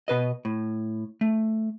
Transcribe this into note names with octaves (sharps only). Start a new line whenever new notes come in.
B2 B4 D#5
A2
A3